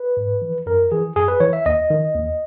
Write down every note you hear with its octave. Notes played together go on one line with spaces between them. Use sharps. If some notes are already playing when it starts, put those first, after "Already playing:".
Already playing: B4
G#2
E3
F#2 A#4
E3 G#4
F#2 G#4
B4
E3 C#5
E5
D#2 D#5
D#3
D#2